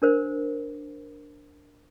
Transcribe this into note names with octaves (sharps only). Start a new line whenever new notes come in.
D4 A#4 C5